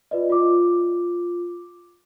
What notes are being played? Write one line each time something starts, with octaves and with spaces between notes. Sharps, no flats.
F4 B4 D5 D#5
F4 D6